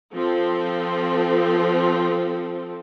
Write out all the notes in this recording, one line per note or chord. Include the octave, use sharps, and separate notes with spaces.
F3 C4 A4